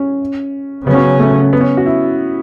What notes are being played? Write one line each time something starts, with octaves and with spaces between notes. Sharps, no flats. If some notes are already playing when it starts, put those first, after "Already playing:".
Already playing: C#4
C#3 F#3 B3 C#4
A3
B3
C#4
F#4
E4